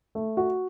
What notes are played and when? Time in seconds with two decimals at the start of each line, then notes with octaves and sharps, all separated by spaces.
0.15 A3
0.37 F#4